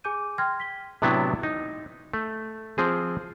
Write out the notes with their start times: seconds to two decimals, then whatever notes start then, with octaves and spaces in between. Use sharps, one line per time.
0.04 G#4 G#5 D6 G6 D#7
0.38 G5 C6 F6 G#6 A#6
0.60 B6 G7
1.02 A2 C3 F#3 B3 D4 E4
1.43 D#4
2.13 A3
2.78 F3 C4 G#4